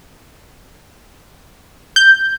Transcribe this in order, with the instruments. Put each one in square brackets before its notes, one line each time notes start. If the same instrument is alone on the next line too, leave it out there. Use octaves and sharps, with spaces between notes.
[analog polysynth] G6